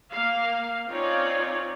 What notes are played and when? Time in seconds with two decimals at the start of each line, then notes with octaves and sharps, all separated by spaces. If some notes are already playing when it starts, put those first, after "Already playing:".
0.11 A#3 F5
0.88 C4 C#4 D#4 F4 C#5 D5